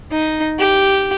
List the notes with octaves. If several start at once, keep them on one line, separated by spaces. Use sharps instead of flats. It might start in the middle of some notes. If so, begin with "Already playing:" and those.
D#4
G4